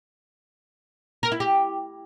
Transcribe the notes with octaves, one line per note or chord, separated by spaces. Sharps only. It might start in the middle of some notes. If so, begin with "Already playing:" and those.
A#4
E4
G4